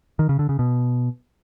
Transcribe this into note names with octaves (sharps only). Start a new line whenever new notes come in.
D#3
C#3
D3
C#3
B2